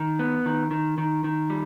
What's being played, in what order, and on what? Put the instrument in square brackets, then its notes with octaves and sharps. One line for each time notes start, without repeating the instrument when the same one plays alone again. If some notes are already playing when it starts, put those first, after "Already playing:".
Already playing: [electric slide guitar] D#3
B3
D#3
D#3
D#3
D#3
G3